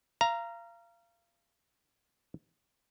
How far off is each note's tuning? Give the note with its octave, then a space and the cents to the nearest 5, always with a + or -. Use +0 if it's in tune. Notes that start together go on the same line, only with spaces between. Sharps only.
F5 -30 A#5 +0